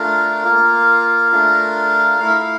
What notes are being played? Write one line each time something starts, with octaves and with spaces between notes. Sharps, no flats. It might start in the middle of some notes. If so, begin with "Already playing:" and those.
Already playing: A3 D4 F4 A#4
A#3 F4
A3 D4 F4
A3 E4 E5 F5
F5